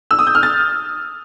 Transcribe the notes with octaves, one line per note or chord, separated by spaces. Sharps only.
E6
D#6
G6
F6
A6